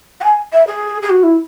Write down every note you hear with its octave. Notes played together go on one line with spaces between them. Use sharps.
F#5
G#5
E5
G#4
G#4
F#4
E4